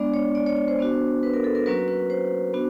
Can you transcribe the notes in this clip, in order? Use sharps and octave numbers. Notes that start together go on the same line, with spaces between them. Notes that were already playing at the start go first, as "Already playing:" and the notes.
Already playing: G#3 B3 D4 D5
C#5
D5
C#5
C#5
C5
B3 D4 F#4
B4
A#4
A4
A#4
F#3 A#3 C#4 F#4 B4
B4
C5
B3 D4 F#4